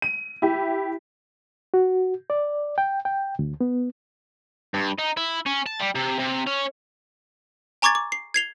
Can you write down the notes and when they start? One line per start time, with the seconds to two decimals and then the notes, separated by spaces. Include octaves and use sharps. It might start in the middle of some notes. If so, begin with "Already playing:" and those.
0.02 D#7
0.42 E4 G4
1.74 F#4
2.30 D5
2.78 G5
3.05 G5
3.39 D2
3.61 B3
4.74 G2
4.99 D#4
5.17 E4
5.46 C#4
5.66 A5
5.80 G3
5.95 C3
6.19 C3
6.47 C#4
7.82 G#5 A#5 C#6 D6 G#6 A6
7.95 D6
8.12 C7
8.34 G#6 C7 F7 G7